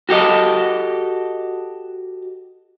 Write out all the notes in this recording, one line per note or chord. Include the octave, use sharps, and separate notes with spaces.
F#4 G4 A4 D#5